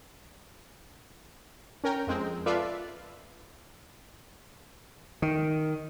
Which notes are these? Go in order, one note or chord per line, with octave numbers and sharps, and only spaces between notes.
C#4 A#4 G5
F2 G#3 C4
F4 A4 B4 D5 E5 F5
D#3